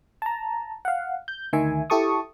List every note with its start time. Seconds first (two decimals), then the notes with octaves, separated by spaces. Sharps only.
0.22 A5 A#5
0.85 F5 F#5
1.28 G6
1.53 D2 D#3 E5 G#5
1.90 E4 G4 A4 A5 C#6 D#6